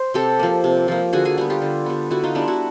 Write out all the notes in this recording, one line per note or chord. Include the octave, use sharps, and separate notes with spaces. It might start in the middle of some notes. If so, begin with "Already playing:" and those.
Already playing: C5
C3 G4 A4
F3 A#3
C3
F3 A#3
D3 F#4 G#4
F#4 G#4
G3 B3 F#4 G#4
F4 G4
D3
G3 B3
D3 E4 F#4
D#4 F4
G3 B3 D4 E4
E4 F#4